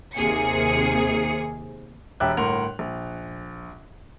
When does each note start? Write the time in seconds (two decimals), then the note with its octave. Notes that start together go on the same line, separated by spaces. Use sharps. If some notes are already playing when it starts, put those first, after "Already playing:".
0.15 D#2 C3 A#3 G#4 C#7
2.20 E1 G4 E5 D6 F#6
2.37 G1 A2 A#4 F#5 C6 F7
2.79 A#1